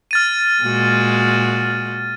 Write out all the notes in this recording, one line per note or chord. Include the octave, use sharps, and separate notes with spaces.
F6 A6 D#7
A#2 G#3 F#4